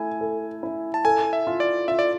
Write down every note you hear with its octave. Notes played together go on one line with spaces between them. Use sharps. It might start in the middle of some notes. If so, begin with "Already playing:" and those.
Already playing: A3 E4 G#5
A4
E4
A5
A4 G#5
E5
F4
D5
F4 E5
D5